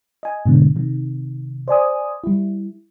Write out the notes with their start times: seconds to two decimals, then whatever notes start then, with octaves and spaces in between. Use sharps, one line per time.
0.23 D#5 G#5
0.46 G#2 B2 D3
0.76 C3 D#3
1.68 C5 D5 G#5 D#6
2.24 G3 E4